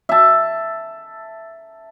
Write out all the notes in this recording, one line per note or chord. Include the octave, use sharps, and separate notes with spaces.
E5 A5